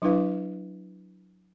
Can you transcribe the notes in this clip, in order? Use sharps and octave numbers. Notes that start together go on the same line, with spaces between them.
F#3 D4 E4 B4 F5